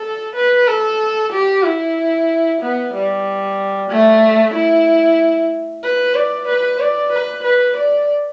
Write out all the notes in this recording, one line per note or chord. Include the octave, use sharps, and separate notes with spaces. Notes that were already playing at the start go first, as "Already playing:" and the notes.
Already playing: A4
B4
A4
G4
E4
B3
G3
A3
E4
B4
D5
B4
D5
B4
B4
D5